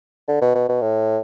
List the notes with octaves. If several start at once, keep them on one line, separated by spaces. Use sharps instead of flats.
D3
B2
B2
B2
A2